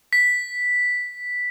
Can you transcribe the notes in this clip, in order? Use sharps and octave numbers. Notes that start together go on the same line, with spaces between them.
B6